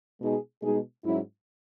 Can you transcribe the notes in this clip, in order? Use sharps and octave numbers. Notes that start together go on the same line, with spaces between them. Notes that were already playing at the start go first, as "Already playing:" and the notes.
B2 G#3 D#4 G#4
B2 G#3 D#4 G#4
G#2 F#3 C#4 E4